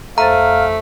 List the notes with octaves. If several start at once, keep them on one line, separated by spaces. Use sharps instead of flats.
F2 A3 C5 F5 A#5 A6